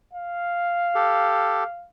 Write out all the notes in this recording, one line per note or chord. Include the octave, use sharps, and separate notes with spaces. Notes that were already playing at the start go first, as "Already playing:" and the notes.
F5
G4 A4